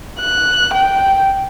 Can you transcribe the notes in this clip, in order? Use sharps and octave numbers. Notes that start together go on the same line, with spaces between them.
F#6
G5